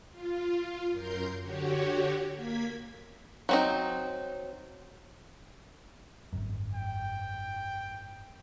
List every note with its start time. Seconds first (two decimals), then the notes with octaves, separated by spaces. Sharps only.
0.11 F4
0.91 F#2 A#4 C6 G6
1.42 D3 F#4 G4 C#5
2.35 A#3 G#6 B6
3.49 F#3 C4 D#4
6.33 G#1 F#2
6.74 G5